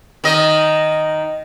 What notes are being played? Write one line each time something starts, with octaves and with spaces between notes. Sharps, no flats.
D#3 D#5